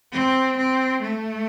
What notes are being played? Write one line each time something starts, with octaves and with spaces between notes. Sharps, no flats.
C4
C4
A3